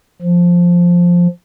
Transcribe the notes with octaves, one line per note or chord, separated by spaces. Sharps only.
F3